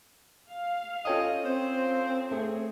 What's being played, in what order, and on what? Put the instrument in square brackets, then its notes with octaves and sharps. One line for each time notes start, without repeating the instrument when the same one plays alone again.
[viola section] F5
[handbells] C#4 C#5 D#6 [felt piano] F4 A4 G5 [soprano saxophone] D#5
[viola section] C4 [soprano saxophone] C5
[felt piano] A3 [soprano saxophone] G#4